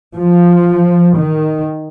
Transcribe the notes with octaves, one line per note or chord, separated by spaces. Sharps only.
F3
D#3